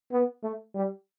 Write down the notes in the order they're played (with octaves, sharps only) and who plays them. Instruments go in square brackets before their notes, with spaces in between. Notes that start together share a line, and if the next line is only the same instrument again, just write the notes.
[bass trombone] B3
A3
G3